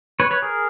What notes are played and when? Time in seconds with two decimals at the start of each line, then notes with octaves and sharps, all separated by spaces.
0.20 B4 C#5
0.31 B4 C#5
0.42 G#4 A#4